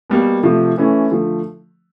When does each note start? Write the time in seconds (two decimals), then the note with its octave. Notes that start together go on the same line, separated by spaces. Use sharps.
0.10 B2 G3 A#3
0.43 C3 F3 A3
0.77 E3 A3 C#4 E4
1.11 D3 F3 A3